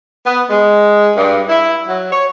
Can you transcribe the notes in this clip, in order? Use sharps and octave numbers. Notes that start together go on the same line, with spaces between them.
B3
G#3
G2
E4
F#3
C#5